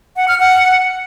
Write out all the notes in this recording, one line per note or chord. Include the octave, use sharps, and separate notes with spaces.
F#5
F6
F#5